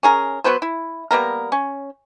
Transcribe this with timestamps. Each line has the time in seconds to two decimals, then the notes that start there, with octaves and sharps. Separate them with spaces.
0.03 C#4 G#4 A#4
0.44 F#3 B3 B4 C5
0.62 E4
1.11 G3 A#3 B3 A#4
1.52 C#4